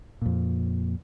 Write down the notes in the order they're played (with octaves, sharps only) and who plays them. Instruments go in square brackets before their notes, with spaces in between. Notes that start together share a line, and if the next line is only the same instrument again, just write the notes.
[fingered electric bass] F2 A#2